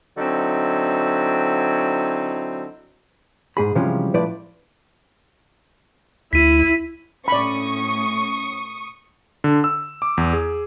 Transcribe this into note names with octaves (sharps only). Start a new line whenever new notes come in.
D3 F#3 C4 D#4 E4
G#2 G#4 B5
C3 E3 F3 G3 G#3 C#4
A2 F3 E4 B4 D5
D2 E4 B6 D#7
A2 C#4 D5 B5 C#6 D#6 C#7
D3
E6
D6
E2
G#4